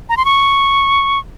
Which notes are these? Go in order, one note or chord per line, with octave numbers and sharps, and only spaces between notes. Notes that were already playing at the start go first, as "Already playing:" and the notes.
A#5
C6
C#6